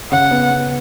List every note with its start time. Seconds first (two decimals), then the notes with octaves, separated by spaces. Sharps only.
0.11 C#3 F#5
0.31 B3
0.51 B3